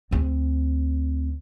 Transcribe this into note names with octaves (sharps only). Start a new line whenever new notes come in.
D2 C4